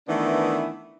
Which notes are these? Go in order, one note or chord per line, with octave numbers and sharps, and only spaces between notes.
D#3 E3 A3 B3 D4